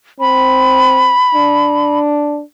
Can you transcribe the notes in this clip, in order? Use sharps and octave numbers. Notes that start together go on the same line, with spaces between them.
C4 B5
D4